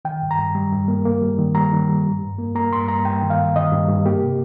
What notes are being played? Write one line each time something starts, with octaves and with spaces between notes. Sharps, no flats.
D#3 G5
G2
A#5
G2
G3
G2
A#3
A#3
G3
D#3
G3 A#5
D#3
G3
G2
G2
A#3
A#3 A#5
G2 C6
G2 A#5
G2 G5
D#3
F5
G2
D#3 D#5
G2
G2
A#3 G4
C3